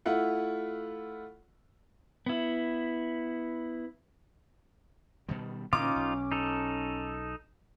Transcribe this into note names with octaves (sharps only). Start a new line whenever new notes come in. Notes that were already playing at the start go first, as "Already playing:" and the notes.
A3 E4 F4 F#5
B3 E4
B2 D#3 G3
A#2 D3 E3 C#4 D#4 F4 D6
B1
D#4 A4